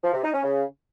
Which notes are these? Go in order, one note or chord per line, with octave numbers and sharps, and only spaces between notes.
F3
C3
D#4
C#4
C#3